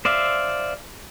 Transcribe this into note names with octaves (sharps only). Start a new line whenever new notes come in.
C5 D5 E5 F5